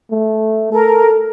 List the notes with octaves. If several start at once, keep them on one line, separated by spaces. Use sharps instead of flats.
A3
A4 A#4